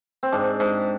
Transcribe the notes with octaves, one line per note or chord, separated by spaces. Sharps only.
C4
G#2 D4
G#2